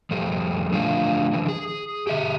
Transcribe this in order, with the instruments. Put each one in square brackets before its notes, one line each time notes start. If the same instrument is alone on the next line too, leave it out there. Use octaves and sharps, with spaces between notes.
[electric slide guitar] F3 G3 A4
D3 F3 A3 D4 F4 F5
D3 E3 F3
G#4
G4 G#4 E5